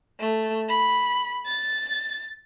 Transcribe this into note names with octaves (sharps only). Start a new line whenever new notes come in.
A3
B5
A6